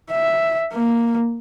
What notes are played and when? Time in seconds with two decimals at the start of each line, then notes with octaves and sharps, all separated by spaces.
0.11 E5
0.73 A#3